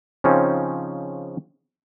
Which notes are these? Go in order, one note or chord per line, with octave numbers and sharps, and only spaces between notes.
C#3 F3 C4 C#4 D#4